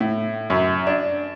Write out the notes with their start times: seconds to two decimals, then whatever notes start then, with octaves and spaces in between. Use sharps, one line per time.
0.01 A2
0.50 F#2
0.87 D4